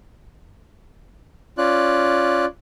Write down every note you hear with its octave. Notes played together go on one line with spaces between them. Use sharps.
C#4 F4 D5 F#6